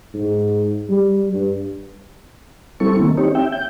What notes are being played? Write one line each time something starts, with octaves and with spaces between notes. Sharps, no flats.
G#2
G3
G2
G3 C4 E4 A4 C#6
D#3 A#3
C4 D#4 G4 C#5
E5 G5
G6